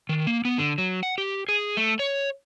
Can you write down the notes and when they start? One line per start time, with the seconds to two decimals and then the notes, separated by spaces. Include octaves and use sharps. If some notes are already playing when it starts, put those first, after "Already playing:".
0.09 D#3
0.27 A#3
0.45 B3
0.58 D3
0.78 F#3
1.03 F#5
1.18 G4
1.49 G#4
1.77 A3
1.99 C#5